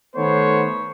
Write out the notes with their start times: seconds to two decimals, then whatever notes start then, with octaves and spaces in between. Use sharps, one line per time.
0.15 D#3 A3 B3 C5 C#5